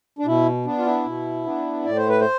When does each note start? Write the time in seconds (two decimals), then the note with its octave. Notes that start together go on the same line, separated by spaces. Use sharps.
0.19 D4
0.26 B2 E4
0.66 B3 D4
0.79 F4
0.86 E4
1.06 B2
1.45 B3 D4
1.85 A2 D5
1.97 C5
2.09 B4
2.20 C5